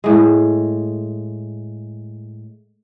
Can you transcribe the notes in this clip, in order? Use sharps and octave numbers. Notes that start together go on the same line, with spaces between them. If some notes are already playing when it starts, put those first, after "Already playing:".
A2 G#3